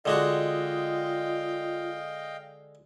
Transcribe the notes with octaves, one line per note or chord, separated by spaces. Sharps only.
D3 G#3 F4 F#4 D#5 F5 G5